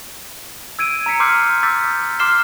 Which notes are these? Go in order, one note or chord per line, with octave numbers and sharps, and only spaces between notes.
E6 G#6 D7 D#7
A#5 E6 B6 C#7
C6 D6 E6 F6 G6 C7
D6 E6 G6 A6 B6
C6 D6 F6 C7 E7 G7